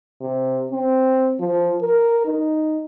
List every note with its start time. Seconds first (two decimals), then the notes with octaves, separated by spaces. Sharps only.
0.21 C3
0.72 C4
1.40 F3
1.82 A#4
2.25 D#4